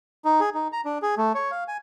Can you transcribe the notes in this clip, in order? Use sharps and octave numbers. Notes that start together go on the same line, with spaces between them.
D#4
G#4
D#4
A#5
D4
G#4
A3
C#5
F5
G#5